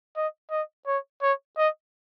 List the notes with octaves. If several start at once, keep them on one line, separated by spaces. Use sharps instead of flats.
D#5
D#5
C#5
C#5
D#5